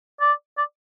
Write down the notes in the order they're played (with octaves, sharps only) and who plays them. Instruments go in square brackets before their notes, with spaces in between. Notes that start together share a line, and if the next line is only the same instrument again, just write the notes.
[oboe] D5
D5